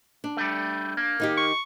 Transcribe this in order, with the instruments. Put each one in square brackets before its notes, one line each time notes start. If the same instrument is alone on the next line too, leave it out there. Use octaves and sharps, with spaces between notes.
[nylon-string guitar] D4
[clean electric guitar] G3 A3
A#3
[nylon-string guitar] D#3 D#4 G4
[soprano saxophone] C#6